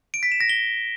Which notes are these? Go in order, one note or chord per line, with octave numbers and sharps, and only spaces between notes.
D7
B6
E7
A#6
G7